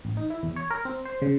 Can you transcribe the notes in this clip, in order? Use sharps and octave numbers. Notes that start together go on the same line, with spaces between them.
A1
D#4
E4
E2
C#5
A#4
C4
C5
C#3